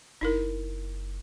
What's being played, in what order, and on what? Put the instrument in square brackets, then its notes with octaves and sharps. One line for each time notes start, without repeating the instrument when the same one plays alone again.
[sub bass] F#1 [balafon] D#4 E4 A#4